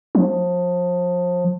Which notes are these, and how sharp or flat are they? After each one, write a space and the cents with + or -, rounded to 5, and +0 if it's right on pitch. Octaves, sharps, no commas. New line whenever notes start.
F3 +30